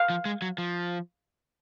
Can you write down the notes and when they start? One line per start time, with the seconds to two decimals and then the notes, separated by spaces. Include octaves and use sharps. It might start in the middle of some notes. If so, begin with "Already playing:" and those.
Already playing: F5
0.10 F3
0.26 G#3
0.42 F#3
0.58 F3